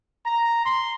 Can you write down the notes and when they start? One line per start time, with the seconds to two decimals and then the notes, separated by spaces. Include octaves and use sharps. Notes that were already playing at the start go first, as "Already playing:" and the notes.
0.24 A#5
0.64 C6